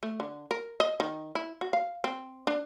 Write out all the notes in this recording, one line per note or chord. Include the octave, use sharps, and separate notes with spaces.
A3
D3
A#4
D#5
D#3
E4
F#4
F5
C4
D4